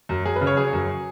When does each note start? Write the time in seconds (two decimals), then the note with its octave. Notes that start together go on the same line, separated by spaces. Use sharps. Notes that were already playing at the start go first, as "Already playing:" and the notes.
0.09 F#2
0.26 F#2 G#4
0.36 B4
0.41 C#3
0.47 C#5
0.56 F#3 G#4
0.73 F#2